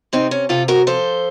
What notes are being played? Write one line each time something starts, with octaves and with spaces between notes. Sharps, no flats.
C3 C4 D#4
C#4
C3 F4 A4
F#4 A#4
F3 A4 C5